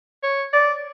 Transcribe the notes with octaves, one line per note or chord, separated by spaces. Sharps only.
C#5
D5